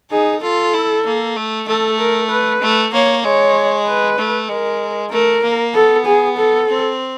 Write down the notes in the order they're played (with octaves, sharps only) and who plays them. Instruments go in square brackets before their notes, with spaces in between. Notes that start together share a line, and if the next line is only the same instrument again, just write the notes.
[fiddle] D#4 [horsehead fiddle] G#4
[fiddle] F4 [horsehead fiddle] A4
[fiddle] E4
A#3
A3
[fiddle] A3 [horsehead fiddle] A4
[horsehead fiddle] A#4
B4
[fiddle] A3
[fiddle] A#3 [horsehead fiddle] C#5
[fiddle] G#3 [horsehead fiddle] C#5
[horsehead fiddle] B4
[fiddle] A3
[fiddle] G#3 [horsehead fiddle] A#4
[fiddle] A3 [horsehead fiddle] A#4
[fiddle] A#3
[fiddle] B3 [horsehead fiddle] A4
[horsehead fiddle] G#4
A4
[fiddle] C4